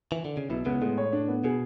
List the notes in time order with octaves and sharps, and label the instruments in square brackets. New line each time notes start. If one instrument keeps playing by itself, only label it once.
[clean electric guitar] E3
D3
C#3
[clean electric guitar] B1 B2 [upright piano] E4
[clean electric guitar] C#2 C#3 [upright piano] B3
[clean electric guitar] A2 [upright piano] G#3
[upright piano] C#5
D4
B3
[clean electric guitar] B2 [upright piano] G#4